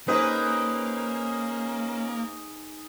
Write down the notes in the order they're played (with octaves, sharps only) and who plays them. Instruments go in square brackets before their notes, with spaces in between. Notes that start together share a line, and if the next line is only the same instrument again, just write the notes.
[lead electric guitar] A#3 [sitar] C4 B4 [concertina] C#4 [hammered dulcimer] D#4 G#4